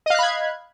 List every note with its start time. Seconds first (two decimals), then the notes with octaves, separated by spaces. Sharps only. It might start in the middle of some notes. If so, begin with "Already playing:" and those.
0.06 D#5
0.10 F5
0.15 F#6
0.19 B5
0.23 G#6